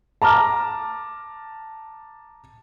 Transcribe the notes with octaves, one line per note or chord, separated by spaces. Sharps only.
A5 A#5 D6 F6